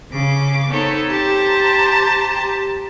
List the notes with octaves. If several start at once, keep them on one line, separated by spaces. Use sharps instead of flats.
C#3 D6
B3 C4 D#4 A4 C#5
G4 C5 A5 A#5